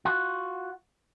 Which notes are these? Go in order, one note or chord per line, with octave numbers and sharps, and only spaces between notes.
F4 F#4